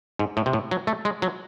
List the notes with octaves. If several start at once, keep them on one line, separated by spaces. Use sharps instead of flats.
G#2
A2
C3
A2
F#3
A3
G#3
F#3